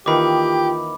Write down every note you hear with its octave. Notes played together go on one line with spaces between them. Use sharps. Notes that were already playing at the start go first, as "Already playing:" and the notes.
D#2 D#3 E3 F4 G4 G5 B5 D6